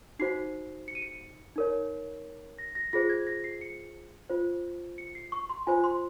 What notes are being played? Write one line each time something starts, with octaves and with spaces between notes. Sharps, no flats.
D#4 F#4 C5 C7
C#7
D#7
C#7
D#4 A#4 C#5
A#6
A#6
F4 G#4 C5 A#6
G#6
A#6
C7
C#7
F4 C5
C#7
C7
C#6
C6
F4 C5 G#5
C6